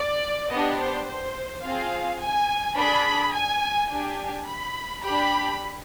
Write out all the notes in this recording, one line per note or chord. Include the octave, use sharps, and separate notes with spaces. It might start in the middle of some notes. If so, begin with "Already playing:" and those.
Already playing: D5
B3 D4 G4 D#5
C5
C5
C4 F4 G#4 F5
G#5
D4 G#4 B5
G#5
D4 G4 G#5
B5
D4 G4 B5